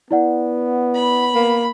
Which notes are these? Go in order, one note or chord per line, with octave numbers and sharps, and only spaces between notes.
B3 E4 D5 F#5
B5
A#3